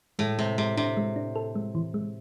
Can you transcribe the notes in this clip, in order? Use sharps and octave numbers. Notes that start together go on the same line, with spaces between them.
A2 G#3
C3 G#3
C3 G#3
C3 D4
G#3
D4
A4
G#3
E3
G#3